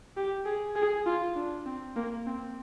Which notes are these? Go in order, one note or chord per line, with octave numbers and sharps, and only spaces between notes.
G4
G#4
G#4
F4
D4
C4
A#3
C4